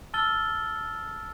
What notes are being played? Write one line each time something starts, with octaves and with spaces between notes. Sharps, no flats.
A5 E6 F6 A6 G7